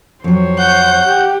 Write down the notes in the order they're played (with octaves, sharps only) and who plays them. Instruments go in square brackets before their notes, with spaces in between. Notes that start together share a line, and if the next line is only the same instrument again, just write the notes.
[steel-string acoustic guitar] F2 F#3 [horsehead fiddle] C5 C#5
[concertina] F#5 [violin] G6
[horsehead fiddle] G4